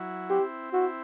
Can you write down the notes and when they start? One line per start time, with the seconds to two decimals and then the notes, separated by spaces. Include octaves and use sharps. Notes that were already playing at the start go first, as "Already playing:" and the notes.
Already playing: F#3 E4
0.30 C4 G4
0.73 E4 F#4